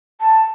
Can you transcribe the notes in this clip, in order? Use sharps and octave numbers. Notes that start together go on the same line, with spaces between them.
A5